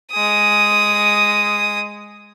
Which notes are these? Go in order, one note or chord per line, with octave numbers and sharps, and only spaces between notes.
G#3 D#6